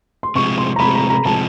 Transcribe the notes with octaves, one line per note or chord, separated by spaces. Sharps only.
C6
C3 F3 G#3 C#6
C6
A#5
C3 F3 G#3 B5
A#5
A#5
C3 F3 G#3 A5